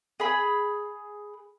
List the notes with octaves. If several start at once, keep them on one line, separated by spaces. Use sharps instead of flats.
G#4 B5